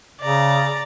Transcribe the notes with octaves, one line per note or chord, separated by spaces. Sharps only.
C#3 D5 A#5